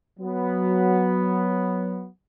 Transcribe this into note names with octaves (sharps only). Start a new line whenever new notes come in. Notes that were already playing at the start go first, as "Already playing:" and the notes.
F#3 B3